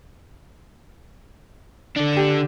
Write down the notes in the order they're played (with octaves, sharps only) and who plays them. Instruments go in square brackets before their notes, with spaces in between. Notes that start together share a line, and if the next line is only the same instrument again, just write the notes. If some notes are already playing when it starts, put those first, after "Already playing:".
[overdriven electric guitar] D3 D4
[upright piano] G4 E7